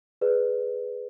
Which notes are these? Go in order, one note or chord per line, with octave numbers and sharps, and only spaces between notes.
G#4 B4 D5